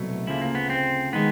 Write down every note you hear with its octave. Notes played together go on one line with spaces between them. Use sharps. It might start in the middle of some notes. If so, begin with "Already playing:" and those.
Already playing: C2 B2 F#3 A3
D2 C#3 F3 A#3 E4
A#3
B3
C4
D#3 G#3 B3